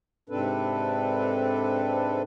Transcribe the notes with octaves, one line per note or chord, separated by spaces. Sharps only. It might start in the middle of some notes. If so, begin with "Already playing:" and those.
G#2 C3 C4 D4 A4 B4